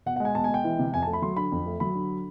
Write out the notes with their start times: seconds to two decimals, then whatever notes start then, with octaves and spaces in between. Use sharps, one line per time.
0.06 B2 F#5
0.16 F#5
0.20 G#3 G#5
0.35 B2 A5
0.44 G#5
0.49 G#3 G5
0.64 E3
0.79 C3
0.93 F2 G#5
1.03 A5
1.07 A3
1.13 B5
1.22 F#3 C6
1.37 D3 B5
1.52 F2
1.66 A3
1.80 F#3 B5
1.95 D3